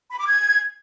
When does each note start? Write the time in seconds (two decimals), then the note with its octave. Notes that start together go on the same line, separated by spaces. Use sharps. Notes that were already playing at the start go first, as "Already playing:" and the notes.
0.11 B5
0.19 D6
0.27 G#6